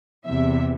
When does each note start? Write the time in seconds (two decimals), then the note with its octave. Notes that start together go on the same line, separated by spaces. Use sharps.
0.27 E2 C3 E3 E5